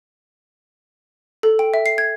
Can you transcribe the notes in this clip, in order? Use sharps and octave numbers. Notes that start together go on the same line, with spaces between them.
A4
G5
E5
C7
G#6